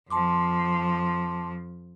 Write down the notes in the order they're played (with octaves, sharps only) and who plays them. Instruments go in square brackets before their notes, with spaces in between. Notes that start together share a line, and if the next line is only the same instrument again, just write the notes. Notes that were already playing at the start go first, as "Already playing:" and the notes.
[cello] F2 F3 [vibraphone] A5 C6 D6